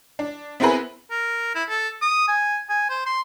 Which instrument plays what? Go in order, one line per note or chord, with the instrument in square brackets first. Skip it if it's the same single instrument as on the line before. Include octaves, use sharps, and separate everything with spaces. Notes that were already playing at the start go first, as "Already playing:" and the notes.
[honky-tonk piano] D4
B3 C4 E4 G#4 A#4 B4
[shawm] A#4
E4
A4
D#6
G#5
G#5
C5
C6